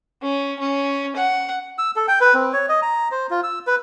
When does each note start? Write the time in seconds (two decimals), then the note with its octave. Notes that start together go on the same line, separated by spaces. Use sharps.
0.23 C#4
0.59 C#4
1.16 F#5
1.78 E6
1.96 A4
2.08 G5
2.21 B4
2.34 C4
2.53 C#5
2.69 D#5
2.82 A#5
3.12 C5
3.31 F4
3.43 E6
3.67 B4